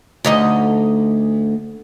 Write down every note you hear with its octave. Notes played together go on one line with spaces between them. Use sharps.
D2 D#4 D#5